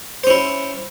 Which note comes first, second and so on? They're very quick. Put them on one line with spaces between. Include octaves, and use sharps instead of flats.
C5 C#4 E4